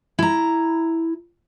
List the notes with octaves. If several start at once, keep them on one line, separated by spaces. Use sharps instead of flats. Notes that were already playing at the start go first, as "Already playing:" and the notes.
E4 A#5